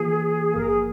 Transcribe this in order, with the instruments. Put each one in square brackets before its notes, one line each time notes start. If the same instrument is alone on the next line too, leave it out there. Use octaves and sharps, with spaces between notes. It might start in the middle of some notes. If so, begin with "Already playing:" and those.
Already playing: [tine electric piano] E3 A#3 F4 [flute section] G#4
[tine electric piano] G#1 G2 F3 A#3 [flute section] A#4
[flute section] G#4